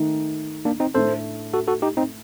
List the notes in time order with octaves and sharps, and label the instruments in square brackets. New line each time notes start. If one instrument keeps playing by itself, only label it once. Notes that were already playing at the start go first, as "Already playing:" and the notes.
Already playing: [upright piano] D#3 A3 D#4
[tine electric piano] A#3 D4
C4 D#4
[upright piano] A2 A3 D4 [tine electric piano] A4 C5
[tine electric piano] F#4 A4
F#4 A4
D#4 G4
C4 D#4